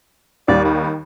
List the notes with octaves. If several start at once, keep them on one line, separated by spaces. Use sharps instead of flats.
D#2 G3 D5
D#3